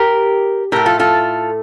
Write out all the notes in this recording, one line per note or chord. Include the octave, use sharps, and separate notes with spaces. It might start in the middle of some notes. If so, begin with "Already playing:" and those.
Already playing: G4 A#4
A2 A3 G4 A#4
F4 A4
F4 A4